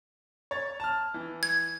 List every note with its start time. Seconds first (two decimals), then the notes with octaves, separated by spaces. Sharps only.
0.51 C#5 A6
0.80 A5 F6
1.14 E3
1.43 G#6